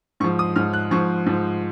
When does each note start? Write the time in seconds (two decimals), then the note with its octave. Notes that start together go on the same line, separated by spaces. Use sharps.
0.20 G#2 C#6
0.24 F3
0.39 D#6
0.56 G#2 F3 F6
0.73 F#6
0.91 G#2 F3 C#6
1.26 G#2 F3